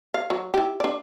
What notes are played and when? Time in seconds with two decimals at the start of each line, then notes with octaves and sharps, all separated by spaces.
0.14 F5
0.30 F#3
0.54 E4 G4
0.80 D4 D5